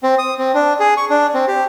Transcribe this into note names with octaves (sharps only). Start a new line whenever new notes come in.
C4
D#6
C4
D4
G#4
C#6
D4
C4
G4